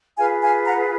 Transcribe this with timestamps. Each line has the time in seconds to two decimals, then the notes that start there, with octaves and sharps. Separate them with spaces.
0.18 F4 G#4 B4 F5 G#5
0.42 F5 G#5
0.66 F#5 A#5